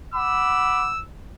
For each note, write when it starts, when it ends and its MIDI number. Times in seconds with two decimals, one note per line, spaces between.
0.14 0.89 78
0.14 0.89 83
0.14 0.89 86
0.14 1.02 88